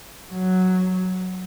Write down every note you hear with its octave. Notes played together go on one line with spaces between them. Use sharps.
F#3